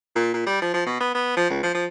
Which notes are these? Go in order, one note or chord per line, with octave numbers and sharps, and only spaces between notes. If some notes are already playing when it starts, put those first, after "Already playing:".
A#2
A#2
G3
F3
F3
B2
B3
B3
F3
C#2
F3
F3